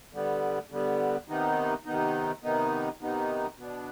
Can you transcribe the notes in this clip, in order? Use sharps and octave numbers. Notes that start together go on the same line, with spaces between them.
D3 G3 B3
D3 G3 B3
C3 D#3 B3 D#4
C3 D#3 B3 D#4
C3 D#3 B3 D#4
C3 D#3 B3 D#4
B2 B3 D4